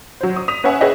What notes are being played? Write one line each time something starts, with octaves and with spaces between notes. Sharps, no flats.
F#3 C5
D#6
D#6 B6 F7
C#4 B4 C#5 E5 F#5 G#5
G#4 B4 C#5 D#5 E5 G5